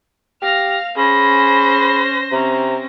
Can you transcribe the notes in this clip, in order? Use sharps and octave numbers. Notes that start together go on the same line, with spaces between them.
G4 F5 F6 A#6
C#4 G#4 C5 B5 A#6
C3 C4 C#4 A#5